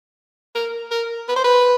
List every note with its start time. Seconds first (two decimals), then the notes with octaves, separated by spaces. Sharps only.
0.55 A#4
0.91 A#4
1.29 B4
1.37 C5
1.44 B4